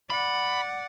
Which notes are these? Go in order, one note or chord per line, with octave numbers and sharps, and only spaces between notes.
D5 F#5 B5